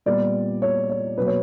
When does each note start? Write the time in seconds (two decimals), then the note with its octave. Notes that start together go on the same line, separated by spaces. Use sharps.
0.06 A#2 G3 B3 D5
0.62 C#5
0.90 C#5
1.18 B2 F#3 A#3 B4
1.27 C#5